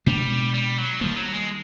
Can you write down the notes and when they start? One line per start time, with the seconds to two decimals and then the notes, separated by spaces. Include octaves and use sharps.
0.06 B2 G3 G#3 B3 D4
0.54 G3
0.78 F#3
1.01 D#3 F3 G3 A#3
1.17 F#3
1.33 G#3